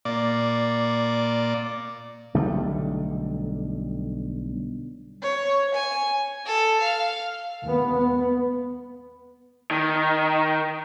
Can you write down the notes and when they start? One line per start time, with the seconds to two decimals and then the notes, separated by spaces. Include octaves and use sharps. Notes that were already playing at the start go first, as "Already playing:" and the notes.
0.05 A#2 D5
2.34 B1 D3 G3 A3
5.22 C#5
5.74 G#5
6.46 A4
6.80 F5
7.63 D#2 B3
7.95 B3
9.71 D#3